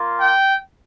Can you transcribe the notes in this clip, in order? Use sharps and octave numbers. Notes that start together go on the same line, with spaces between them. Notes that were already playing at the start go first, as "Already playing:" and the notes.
Already playing: A#3 F4
G5